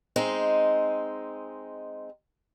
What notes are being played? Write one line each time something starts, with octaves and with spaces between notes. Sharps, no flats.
G#3 C4 D#4